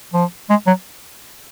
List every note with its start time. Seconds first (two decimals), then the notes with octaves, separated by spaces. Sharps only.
0.14 F3
0.50 G#3
0.67 F#3